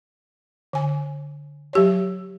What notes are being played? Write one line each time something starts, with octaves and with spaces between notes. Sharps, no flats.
D3 G#5
F#3 G4 C#5